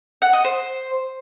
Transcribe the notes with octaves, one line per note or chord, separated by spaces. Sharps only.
F#5
D#5
C5